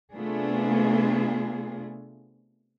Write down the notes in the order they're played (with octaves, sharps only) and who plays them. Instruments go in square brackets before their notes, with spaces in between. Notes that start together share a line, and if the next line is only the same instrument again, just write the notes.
[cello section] C3 A3 B3 D4 F4 G#4